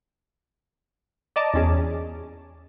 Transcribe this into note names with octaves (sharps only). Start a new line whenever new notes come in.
D5 D#5 A5 A#5 D6
E2 C#4 G#4